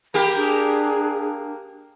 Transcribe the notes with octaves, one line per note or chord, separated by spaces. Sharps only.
A#3 G4 B5
D4 G#4